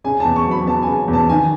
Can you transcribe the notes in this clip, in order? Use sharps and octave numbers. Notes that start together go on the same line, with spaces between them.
C#3 G#5
E2 A5
C#6
F#3
B5
B3 A5
G#5
C#3
E2
A5
D#3 G#5